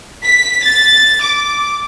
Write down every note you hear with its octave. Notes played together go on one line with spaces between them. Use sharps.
B6
A6
D6